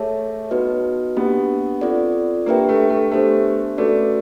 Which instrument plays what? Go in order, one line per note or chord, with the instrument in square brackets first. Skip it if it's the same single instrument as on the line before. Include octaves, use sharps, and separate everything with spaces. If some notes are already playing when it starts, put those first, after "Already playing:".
Already playing: [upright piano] A3 [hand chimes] G#4 C#5 E5 A5
[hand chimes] B3 D#4 F#4 B4 D#5
[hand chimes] A#3 D4 G4 [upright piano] B3
[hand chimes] C4 F4 A4 D5
[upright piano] A#3 [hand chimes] D4 G4 B4 E5 G5
[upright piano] A3
A3
[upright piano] A3 [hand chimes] B3 D4 G4 C5 E5
[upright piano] A3 [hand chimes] C#4 F#4 B4 D5